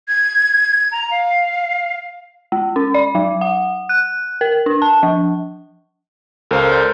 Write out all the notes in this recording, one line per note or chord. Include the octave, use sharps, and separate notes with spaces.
G#6
A#5
F5
G#3
C#4
D5
F#3
F#5
F#6
A#4
D4
A5
F3
C#2 A4 A#4 C5 F5 A#5
D5 C6 G6